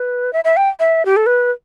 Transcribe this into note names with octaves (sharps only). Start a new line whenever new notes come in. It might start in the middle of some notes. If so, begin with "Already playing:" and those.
Already playing: B4
E5
E5
G5
E5
G4
A4
B4